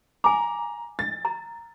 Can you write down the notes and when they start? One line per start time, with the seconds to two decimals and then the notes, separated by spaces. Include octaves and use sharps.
0.24 G#5 A#5 D6
0.99 A6
1.25 A#5